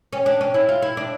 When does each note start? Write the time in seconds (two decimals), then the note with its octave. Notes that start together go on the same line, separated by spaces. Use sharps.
0.13 C#4
0.26 D4
0.41 C#4
0.54 E4
0.69 F4
0.82 E4
0.97 D4